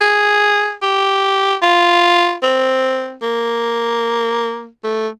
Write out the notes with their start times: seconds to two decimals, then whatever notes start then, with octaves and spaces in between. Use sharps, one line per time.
0.01 G#4
0.82 G4
1.62 F4
2.43 C4
3.22 A#3
4.84 A3